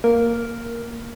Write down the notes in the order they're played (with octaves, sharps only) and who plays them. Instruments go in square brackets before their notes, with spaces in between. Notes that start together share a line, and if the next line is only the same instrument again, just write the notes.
[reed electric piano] A#3 [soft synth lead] A#4